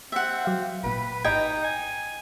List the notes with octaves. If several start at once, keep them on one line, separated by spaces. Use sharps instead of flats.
C4 E5 F#5
F#3 F5
G#1 A#2 B4
G#1 D#4 D#5 G5 G#6
G#5